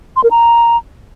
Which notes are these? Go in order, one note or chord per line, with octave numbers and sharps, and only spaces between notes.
C6
A#4
A#5